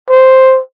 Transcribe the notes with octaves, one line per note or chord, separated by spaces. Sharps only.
C5